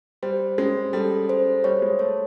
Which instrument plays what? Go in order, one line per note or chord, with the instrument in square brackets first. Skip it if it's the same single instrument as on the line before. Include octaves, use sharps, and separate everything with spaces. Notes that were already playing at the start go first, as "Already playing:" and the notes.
[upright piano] G3 [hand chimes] C5
[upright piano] G#3 [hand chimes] C#4
[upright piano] G3 [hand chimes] A4
[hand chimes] C5
[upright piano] G3 [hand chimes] C#5
[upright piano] G#3
[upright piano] A3 [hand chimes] C#5